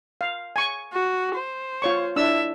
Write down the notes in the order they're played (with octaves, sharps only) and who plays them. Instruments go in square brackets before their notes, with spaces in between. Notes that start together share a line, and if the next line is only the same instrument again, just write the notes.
[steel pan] F5
G#5 C#6
[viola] F#4
C5
[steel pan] F4 C#5 C#6
[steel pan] D4 E6 [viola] E4 E5